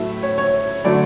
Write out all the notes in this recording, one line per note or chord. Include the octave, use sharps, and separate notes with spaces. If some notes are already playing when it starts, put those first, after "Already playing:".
Already playing: A2 F#3 A3 E5
C#5
C#5
D3 F#3 A3 D5